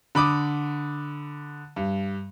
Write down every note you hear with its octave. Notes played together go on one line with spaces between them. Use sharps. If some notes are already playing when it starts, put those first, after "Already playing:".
D3 B5 D6 D#6
G2